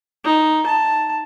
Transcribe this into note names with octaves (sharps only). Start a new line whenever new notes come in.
D#4
A5